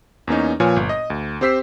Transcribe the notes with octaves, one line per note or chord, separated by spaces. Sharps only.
E2 A#3 C#4 D#4
A#2 F3 B4 C#5 G#5 F6
G1
D#5 D#6
D2
C4 G4 C5 E6 B6 C7